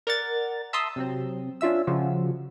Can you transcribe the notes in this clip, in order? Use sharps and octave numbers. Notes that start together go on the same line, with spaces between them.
A#4 D5 F#5 A6
E5 A5 A#5 C6 D#6 E6
C3 F#3 C4
C#4 D4 F4 E5 E6
C#3 F3 F4 F#4